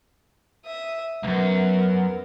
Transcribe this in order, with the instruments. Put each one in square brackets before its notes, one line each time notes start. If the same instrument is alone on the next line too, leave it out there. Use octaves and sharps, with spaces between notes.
[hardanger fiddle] E5 D#6
[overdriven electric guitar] C2 F#2 [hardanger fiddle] B3 A#4